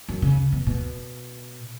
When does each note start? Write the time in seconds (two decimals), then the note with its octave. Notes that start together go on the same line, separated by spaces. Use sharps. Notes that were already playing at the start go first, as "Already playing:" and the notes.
0.09 F#2
0.22 C#3
0.52 B2
0.67 B2